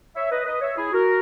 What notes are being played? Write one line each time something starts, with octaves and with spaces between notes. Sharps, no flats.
C#5 E5
B4 D#5
B4 D#5
C#5 E5
E4 G#4
F#4 A#4